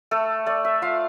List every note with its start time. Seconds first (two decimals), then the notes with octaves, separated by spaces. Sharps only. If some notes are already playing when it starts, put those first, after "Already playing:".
0.11 A3 A4
0.46 A3 D5
0.65 E5
0.82 F4 F5